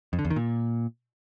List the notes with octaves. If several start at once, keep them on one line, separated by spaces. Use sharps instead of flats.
F2
D3
E2
D#3
A#2